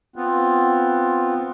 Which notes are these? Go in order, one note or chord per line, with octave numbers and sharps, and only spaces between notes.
B3 C4 F4